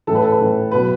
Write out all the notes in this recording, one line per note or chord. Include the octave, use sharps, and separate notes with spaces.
A2 E3 A4
B4
A4
B4
A2 E3
B2 F#3 B4